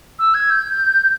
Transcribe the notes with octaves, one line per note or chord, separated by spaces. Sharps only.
E6
G#6
G6